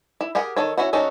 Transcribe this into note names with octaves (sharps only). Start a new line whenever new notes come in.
E4
G4 G#4 A#4 F#5
D#3 A4 C#5
C#4 E4 F#4 F#5
G3 C#4 D#4 F#4 A4